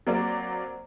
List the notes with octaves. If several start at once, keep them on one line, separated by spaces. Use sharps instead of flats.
F#3 A#3 C4 D5